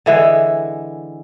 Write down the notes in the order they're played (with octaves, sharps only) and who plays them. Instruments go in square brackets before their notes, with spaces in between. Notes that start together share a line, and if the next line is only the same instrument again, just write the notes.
[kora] D3 E3 G#3